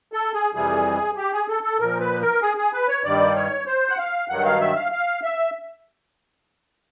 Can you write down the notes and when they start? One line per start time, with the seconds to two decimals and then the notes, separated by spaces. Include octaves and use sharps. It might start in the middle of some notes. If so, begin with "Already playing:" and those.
0.13 A4
0.34 G#4
0.55 F2 C3 E3 G3 G#4
1.17 G4
1.32 G#4
1.48 A4
1.63 A4
1.79 A#2 F3 A#4
2.00 B4
2.21 A#4
2.42 G#4
2.57 G#4
2.73 B4
2.88 C#5
3.04 G2 D#3 G3 D5
3.36 C#5
3.67 C5
3.89 F#5
3.98 F5
4.29 G2 D#3 F#3 F#5
4.45 F5
4.60 E5
4.76 F5
4.92 F5
5.23 E5